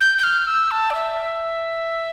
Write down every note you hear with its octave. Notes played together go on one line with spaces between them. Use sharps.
G6
G6
F6
E6
A5
D5
E5